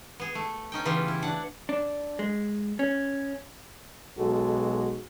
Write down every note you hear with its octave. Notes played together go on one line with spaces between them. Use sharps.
B3 G#4
A3
C#4 D#4 G5
C#3 E3 B3 F4 G4
E4
D4 F#5
D4
G#3
C#4
B1 B2 G#3 F#4 A4